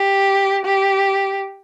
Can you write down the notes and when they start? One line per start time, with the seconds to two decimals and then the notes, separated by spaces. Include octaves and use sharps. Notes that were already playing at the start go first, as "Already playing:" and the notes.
Already playing: G4
0.65 G4